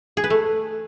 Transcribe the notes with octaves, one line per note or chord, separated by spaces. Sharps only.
G#4
B4
A3